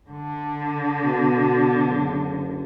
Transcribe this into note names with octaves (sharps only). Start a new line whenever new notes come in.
D3
B2
F#1